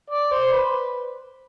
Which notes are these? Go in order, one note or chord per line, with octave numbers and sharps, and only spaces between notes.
D5
C5
B4